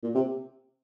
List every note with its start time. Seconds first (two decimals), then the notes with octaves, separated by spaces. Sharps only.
0.03 A#2
0.15 C3